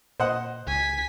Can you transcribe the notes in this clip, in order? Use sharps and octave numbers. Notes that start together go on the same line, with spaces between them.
A#2 C5 D#5 F#5
C#2 G#5 B6